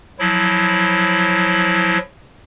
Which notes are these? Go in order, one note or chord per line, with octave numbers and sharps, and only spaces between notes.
F3 F#3 E4